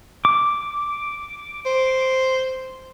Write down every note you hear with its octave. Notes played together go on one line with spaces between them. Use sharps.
D6
C5